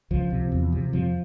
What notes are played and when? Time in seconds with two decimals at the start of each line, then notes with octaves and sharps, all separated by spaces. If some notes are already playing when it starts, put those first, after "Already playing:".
0.11 C#2 F3
0.30 C3
0.52 E2
0.73 C3
0.93 F2 F3